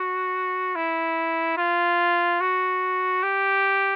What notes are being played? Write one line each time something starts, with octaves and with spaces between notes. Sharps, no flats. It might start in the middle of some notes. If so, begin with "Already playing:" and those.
Already playing: F#4
E4
F4
F#4
G4